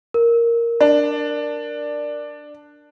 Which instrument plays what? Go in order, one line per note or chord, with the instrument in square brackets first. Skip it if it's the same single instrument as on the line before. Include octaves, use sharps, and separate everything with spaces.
[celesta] A#4
[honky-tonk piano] D4